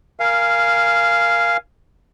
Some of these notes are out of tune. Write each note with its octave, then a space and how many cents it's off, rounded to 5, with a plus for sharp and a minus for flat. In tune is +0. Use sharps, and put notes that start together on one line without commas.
A#4 +0 F5 -10 G#5 +0